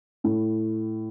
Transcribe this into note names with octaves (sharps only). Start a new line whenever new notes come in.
A2